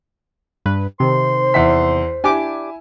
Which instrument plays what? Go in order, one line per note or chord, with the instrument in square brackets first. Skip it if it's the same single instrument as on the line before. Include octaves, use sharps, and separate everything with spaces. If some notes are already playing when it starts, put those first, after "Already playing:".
[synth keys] G2 B4
[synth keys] C3 D#3 [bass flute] C5 [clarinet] C6
[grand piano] E2 E5 B6
[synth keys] D4 G4 D6 [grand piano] E4 G#5